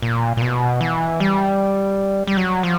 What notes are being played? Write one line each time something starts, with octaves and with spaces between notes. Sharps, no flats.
A#2
A#2
B2
E3
G3
G3
F#3
F3